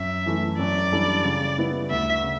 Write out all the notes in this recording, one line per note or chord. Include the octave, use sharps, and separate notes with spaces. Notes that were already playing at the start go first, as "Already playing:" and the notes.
Already playing: F#2 E5
E3 A3 E4
F#2 D5
E3 G3 D4 A4
C#3
G3 B3 E4 B4
D2 E5
C#3